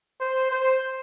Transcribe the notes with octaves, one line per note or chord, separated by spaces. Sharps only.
C5
C5